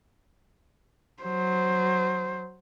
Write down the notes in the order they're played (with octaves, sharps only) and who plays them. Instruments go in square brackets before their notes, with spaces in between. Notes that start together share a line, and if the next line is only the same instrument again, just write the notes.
[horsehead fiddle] F#3 C5